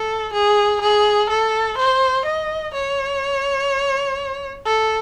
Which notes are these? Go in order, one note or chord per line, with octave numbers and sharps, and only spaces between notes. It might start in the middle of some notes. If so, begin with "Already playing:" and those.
Already playing: A4
G#4
G#4
A4
C5
D#5
C#5
A4